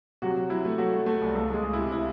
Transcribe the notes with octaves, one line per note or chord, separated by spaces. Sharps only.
C3 F#3 F#4
F#3
F#3 E4
A3
F#3 A3 F#4
F#3
A3 A4
C2
C#2 A3 A4
C#2 G#3 G#4
C#2
E4
C3
E4